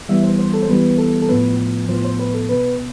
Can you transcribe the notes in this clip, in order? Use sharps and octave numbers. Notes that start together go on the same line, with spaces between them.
E3 G3 B3 E5
C5
C5
A4
C5
E3 G3 B3 B4
A4
A4
A2 F3 B3 B4
A2 F3 B3 C5
C5
B4
A4
B2 B3 B4